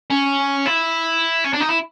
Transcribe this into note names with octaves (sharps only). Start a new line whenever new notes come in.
C#4
E4
C#4
D4
D#4
E4